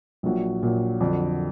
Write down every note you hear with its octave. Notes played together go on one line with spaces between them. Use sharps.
A#1 A#2 F#3
A#1 A#2 F#3
F2 D3 F#3 D4